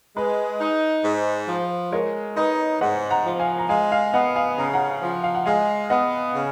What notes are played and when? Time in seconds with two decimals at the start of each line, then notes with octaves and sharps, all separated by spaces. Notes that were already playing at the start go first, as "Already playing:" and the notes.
0.16 G#3 B4
0.60 D#4
1.04 G#2
1.48 F3
1.92 G#3 A#4 C#5
2.36 D#4 B4 D#5
2.81 G#2 D#5 F#5
3.11 F#5 A#5
3.25 F3
3.39 F5 G#5
3.58 A#5
3.69 G#3 F5 G#5
3.92 F5 G#5
4.13 B3 D#5 F#5
4.36 F5 G#5
4.58 C#3 A#5
4.73 F#5 A#5
5.02 F3
5.23 F5
5.35 F#5
5.46 G#3 F5 G#5
5.90 B3 D#5 F#5
6.34 C#3